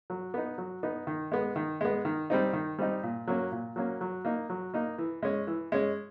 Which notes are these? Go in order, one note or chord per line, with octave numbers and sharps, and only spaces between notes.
F#3
B3 D#4
F#3
B3 D#4
D#3
G#3 B3
D#3
G#3 B3
D#3
G3 C4 D#4
D#3
G3 C4 D#4
A#2
F#3 A#3 C#4
A#2
F#3 A#3 C#4
F#3
A#3 D#4
F#3
A#3 D#4
E3
G#3 C#4
E3
G#3 C#4